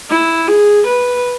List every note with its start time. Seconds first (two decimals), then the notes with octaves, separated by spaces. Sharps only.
0.10 E4
0.47 G#4
0.86 B4